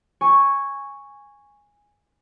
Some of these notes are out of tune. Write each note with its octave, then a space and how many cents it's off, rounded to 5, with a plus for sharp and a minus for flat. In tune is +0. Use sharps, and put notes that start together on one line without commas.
G#5 -10 C#6 +0